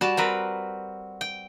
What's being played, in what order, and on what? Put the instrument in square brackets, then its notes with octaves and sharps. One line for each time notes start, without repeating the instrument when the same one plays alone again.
[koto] G3 A5 [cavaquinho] F#4
[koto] C4 A#4 B4
G5